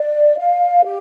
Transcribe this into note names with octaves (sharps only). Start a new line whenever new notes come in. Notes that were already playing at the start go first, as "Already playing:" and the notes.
Already playing: D5
F5
G4